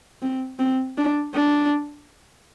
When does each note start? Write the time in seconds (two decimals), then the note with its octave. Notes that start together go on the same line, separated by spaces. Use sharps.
0.22 C4
0.59 C4
0.98 D4
1.34 D4